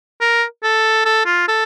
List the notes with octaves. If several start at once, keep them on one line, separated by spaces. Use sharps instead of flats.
A#4
A4
A4
F4
A4